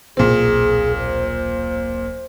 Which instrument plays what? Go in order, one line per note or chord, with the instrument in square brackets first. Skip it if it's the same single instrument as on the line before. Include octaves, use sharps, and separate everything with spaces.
[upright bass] D#1 B1 [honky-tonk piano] A#2 C4 [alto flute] G#4
[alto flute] C5